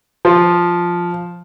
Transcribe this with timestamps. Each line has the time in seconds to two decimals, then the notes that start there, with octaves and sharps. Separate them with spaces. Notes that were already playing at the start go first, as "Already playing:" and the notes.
0.25 F3